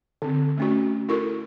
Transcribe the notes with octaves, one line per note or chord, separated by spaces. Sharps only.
D3 C4
A3 C#4 F#4
E4 F#4 A4 A#4 C#6